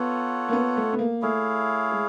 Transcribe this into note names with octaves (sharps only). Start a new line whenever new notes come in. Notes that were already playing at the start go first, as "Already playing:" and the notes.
Already playing: B3 F4 A4 C#5 F#5
A#3
B3
A3
B3
A#3
A3 E4 G#4 C#5 F5
G#3